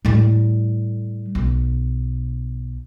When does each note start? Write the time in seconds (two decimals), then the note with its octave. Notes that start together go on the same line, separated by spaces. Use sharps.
0.05 A2 G3
1.35 B1